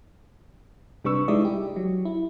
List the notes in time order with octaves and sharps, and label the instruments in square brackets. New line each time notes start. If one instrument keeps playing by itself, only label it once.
[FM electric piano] C3 G3 D4 B4 C#6 E6
G3 G#3 D#4 E4 D5 D#5
G4
F#3
E4